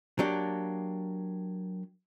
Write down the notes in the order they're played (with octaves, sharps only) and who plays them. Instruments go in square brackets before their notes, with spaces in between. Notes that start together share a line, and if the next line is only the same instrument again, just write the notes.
[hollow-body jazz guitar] F#3 A#3 D4 G4